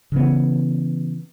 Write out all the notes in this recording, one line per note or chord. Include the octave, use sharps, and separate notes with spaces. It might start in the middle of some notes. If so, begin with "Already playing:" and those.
C#3 E3 B3